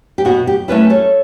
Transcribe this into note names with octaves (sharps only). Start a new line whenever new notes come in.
G4
B2 F#4
G4
A3 C#4 E4 B4 D5
A4 C#5